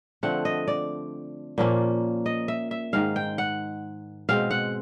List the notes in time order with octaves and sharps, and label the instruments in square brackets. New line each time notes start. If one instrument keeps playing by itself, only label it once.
[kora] D3 F3 A3 C4 F#5
D#5
D5
A#2 F3 A#3 C#4
D#5
E5
E5
G#2 D#3 G#3 F5
G5
F#5
B2 G#3 C4 F5
F#5